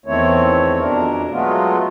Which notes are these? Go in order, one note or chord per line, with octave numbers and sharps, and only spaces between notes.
E2 D#3 A3 C4 E4 C#5
F2 B2 D4 A#4
F#3 G#3 A3 B3 F4